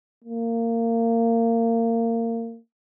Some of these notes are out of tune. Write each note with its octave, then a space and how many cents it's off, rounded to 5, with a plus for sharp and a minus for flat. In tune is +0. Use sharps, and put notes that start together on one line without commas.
A#3 -25